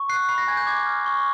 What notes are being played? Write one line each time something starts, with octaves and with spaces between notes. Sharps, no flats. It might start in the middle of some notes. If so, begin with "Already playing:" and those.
Already playing: C#6
F#6 C7
B5 C7
A#6
G#5 G#6
G6
D6 G#6
F6
C#6